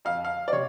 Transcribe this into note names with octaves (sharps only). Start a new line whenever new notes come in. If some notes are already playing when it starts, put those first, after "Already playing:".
F2 F5
F5
D5
C3 C#5